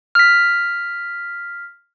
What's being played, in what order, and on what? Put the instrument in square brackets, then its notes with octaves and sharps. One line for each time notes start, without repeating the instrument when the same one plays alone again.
[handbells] F6 B6